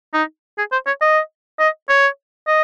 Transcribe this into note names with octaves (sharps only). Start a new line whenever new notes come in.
D#4
G#4
C5
C#5
D#5
D#5
C#5
D#5